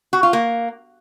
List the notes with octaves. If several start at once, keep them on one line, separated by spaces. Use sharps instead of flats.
F#4
F4
A#3